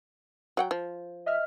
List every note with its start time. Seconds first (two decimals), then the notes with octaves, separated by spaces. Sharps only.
0.57 F#3 F#5 G5
0.71 F3
1.26 D#5 E5 F6